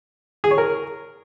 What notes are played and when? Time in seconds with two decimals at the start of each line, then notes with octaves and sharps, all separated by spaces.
0.44 G#4
0.51 C#5
0.58 A#4